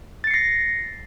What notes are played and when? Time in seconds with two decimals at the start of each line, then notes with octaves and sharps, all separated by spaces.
0.24 A6
0.27 C#7
0.31 C7
0.34 A#6